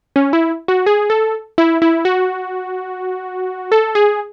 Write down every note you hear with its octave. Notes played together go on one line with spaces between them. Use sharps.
C#4
E4
F#4
G#4
A4
E4
E4
F#4
A4
G#4